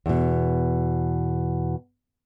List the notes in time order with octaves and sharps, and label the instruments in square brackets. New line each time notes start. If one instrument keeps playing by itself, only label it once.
[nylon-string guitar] E2 B2